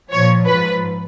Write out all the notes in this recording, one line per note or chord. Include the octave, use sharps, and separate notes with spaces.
A#2 F3 C#5
G#2 F3 B4